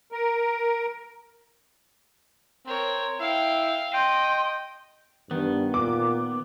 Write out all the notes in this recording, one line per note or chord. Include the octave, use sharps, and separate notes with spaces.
A#4
C4 A#4 C#5
E4 F5 G5
D#5 G5 C6
G2 D#3 B3
A#2 D6